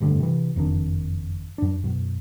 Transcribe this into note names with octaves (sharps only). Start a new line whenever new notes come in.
F1 G2 D3 A3
C3 E3
F#1 F2 D#3 D4
F#2 D4
F#2 B2